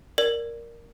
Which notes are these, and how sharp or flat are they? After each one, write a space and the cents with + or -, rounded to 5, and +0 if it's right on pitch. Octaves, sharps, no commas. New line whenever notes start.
A#4 +0 D5 +0